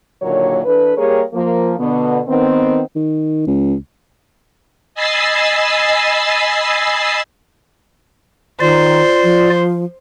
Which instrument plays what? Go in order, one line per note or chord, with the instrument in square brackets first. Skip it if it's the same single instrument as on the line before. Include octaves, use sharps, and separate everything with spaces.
[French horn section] D#2 A#2 D3 F#3 C#5
E3 D4 A4 B4
G3 A#3 G4 G#4 A#4 C#5
F3 A#3
B2 D3 B3
D#3 B3 C4
[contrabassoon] D#3
C#2
[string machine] D#5 G#5 B5 E6 A6 C7
[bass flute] D#3 [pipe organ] F4 D5 [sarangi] C5
[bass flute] F3